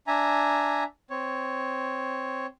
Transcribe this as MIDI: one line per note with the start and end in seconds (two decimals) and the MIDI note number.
0.07 0.84 62
0.07 0.84 76
0.07 0.84 80
0.07 0.84 82
1.10 2.46 60
1.10 2.46 73